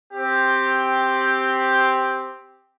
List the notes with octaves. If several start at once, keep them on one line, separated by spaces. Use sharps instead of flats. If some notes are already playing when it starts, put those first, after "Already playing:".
C4 G4